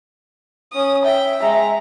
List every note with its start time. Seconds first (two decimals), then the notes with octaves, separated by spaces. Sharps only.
0.73 C#4 D#6
1.04 E5 G5
1.41 G#3 A#5